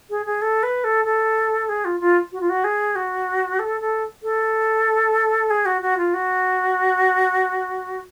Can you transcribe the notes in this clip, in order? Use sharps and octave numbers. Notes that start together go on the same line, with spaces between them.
G#4
G#4
A4
B4
A4
A4
G#4
F4
F4
F#4
F4
F#4
G#4
F#4
A4
A4
A4
G#4
F#4
F#4
F4
F#4